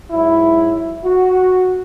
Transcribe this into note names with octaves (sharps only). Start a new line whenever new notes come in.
G#2 F#3 E4
F#4